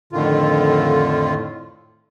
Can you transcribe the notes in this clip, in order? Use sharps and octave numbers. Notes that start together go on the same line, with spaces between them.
F2 A2 D3 D#3 F4